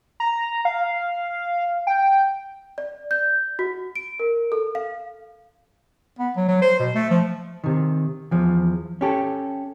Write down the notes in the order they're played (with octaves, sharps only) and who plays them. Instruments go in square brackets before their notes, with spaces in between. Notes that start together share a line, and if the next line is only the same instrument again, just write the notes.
[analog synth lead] A#5
F5
G5
[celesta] D5
G6
F#4
D7
A#4
A4
F5
[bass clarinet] B3
F#3
F#3
C5
B2
A3
F3
[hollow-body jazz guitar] C3 D#3
E2 F3
C#4 G4 A4